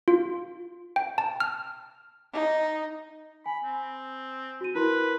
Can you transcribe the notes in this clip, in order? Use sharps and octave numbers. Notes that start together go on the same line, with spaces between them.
F4
G5
A5
F6
D#4
G#5 B5
C4
F#4 D#7
E4 A#4 B4 C6